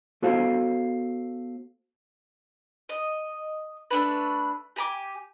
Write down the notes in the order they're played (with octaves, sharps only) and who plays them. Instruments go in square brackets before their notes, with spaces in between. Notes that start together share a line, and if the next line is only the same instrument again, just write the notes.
[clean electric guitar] B3 F#4 A4 C5 D#5 F5
[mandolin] D#5
A3 A#3 D4 B4
G4 G#5 A#5 D6